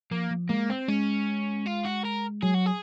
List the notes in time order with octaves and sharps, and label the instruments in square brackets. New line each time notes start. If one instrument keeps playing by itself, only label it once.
[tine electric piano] F3 [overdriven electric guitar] A#3
[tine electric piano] F3
[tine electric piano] G#3 [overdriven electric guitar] A#3
[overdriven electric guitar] C4
[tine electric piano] G#3 [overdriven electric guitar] C#4
[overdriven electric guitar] F4
F#4
A#4
[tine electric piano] F#3 [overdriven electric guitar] G#4
[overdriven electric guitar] F#4
G#4